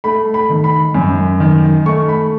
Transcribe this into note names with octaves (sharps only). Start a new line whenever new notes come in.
A3 B5
B5
D#3
B5
F#2
D#3
A3 C#6
B5